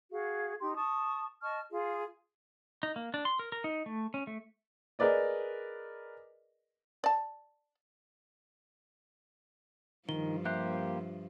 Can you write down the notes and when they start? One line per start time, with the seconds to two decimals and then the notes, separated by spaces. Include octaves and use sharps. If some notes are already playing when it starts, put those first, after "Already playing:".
0.12 F#4 G#4 F5
0.61 D#4 G4 C6
0.76 A5 C#6 D#6
1.43 D#5 A5 C#6 F6
1.71 F4 G#4
2.83 D#4
2.96 A#3
3.14 D4
3.25 C6
3.39 A#4
3.52 A#4
3.64 D#4
3.86 A3
4.14 C#4
4.27 A3
4.99 G#4 A#4 B4 D5 D#5
7.04 D5 A5
10.09 G2 D#3 F3 G7
10.45 A#3 G4 C5 E5 F#6